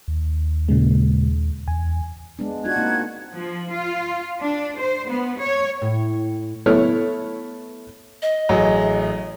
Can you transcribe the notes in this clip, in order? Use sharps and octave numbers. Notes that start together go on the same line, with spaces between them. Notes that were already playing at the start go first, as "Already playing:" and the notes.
D#2
A#2 C#3 G#3
E2 G#5
G#3 B3 D4
D4 D#4 F4 F#4 F#6 G#6
A#3 C4 D#4
F3
F4
D4
C5
B3
C#5
A2
A3 B3 E4 C#5 F6
D#5
A1 F#3 G#4